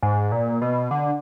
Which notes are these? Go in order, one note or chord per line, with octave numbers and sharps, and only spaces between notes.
G#2
A#2
B2
D3